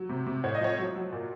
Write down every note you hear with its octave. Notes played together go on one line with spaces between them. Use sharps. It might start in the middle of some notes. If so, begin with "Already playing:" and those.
Already playing: F#3
C3
C3
A2 C#5
D#5
F3 C#5
F#3
F#3
A#2